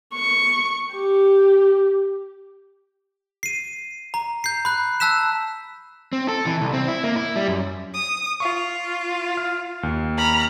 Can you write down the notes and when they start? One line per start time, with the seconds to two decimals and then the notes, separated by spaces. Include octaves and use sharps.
0.14 C#6
0.93 G4
3.43 C7 D#7
4.14 A#5
4.44 G6 C7
4.65 B5 F#6
5.00 A5 E6 F#6 B6 E7
6.13 C4
6.28 A4
6.46 E3
6.61 C2
6.73 C4
6.88 E4
7.03 A#3
7.16 E4
7.36 G3
7.48 F#2
7.94 D#6
8.40 F4 C#6
9.37 F6
9.83 D#2
10.17 A#5 B5 F6